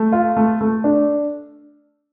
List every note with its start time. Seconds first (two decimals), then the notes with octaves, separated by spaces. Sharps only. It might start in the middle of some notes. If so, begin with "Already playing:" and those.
Already playing: A3
0.12 F4
0.36 A3
0.61 A3
0.84 D4